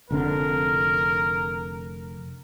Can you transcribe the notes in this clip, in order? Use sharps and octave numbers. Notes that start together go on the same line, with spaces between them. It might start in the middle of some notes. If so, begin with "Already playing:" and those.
F1 D3 C4 A#4